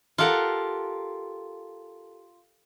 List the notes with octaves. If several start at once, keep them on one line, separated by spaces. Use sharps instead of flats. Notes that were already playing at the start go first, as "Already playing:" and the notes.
F4 G4 A4 A#4 F#5